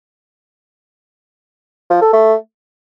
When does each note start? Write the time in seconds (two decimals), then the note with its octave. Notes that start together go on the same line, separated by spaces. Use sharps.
1.90 F3
2.01 A4
2.13 A3